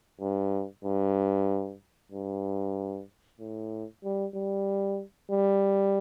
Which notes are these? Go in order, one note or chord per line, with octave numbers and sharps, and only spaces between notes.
G2
G2
G2
A2
G3
G3
G3